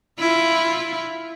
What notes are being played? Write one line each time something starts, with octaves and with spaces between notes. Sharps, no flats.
E4 F4